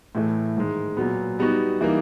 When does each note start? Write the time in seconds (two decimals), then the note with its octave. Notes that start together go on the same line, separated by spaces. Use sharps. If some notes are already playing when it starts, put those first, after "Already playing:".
0.15 A2 E3 A3
0.57 G#2 D#3 G#3
0.97 A#2 F#3 B3
1.39 G3 B3 D#4 F#4
1.81 E3 G3 A#3 D#4